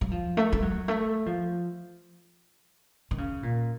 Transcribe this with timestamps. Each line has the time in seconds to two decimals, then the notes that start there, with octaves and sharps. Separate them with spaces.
0.01 F#3
0.12 F3
0.37 A3
0.52 A3
0.62 F#3
0.88 A3
1.26 F3
3.11 D#3
3.18 C#3
3.43 A#2